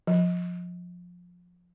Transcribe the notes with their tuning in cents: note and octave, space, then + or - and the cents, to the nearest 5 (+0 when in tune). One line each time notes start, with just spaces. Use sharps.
F3 +20